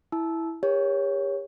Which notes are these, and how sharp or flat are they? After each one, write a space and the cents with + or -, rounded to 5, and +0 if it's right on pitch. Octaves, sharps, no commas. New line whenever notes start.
E4 +0 A5 -25 E6 -5
G4 +40 A#4 +35 C#5 +5